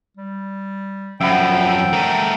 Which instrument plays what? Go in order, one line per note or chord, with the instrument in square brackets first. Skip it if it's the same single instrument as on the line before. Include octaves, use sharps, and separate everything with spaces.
[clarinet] G3
[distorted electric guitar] F#2 F3 [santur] E5 F#5 B5 [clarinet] G5
[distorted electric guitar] A3 A#4